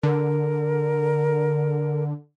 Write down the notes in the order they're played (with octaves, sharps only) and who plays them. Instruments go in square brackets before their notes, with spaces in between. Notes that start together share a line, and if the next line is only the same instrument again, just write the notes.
[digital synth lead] D3 [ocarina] A#4